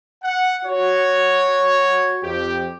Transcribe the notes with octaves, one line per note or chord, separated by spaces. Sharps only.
F#5
F#4 C#5
F2 G4